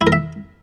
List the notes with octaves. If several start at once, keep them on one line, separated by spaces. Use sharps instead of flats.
E4
A#4
E5